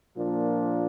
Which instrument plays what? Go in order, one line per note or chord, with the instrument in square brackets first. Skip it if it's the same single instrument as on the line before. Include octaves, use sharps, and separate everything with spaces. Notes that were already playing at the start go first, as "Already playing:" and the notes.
[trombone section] A#2 F3 A#3 D4